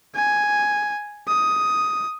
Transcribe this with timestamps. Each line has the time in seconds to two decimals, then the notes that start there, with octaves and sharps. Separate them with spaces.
0.15 G#5
1.27 D#6